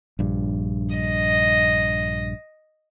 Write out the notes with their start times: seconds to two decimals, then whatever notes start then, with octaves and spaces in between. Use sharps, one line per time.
0.19 A#1 G2
0.93 D#5